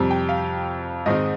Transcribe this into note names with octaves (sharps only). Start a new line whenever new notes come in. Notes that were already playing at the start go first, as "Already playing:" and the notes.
Already playing: F2 C3 G3
G5
F5
G#2 D#3 G#3 C4 D#4 D#5